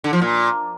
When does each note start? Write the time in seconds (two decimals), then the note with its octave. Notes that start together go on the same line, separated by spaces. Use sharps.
0.04 D3
0.13 F3
0.21 A#2